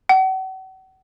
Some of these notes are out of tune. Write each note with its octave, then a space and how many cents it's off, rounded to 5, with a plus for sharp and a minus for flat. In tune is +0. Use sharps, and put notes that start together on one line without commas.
F#5 +40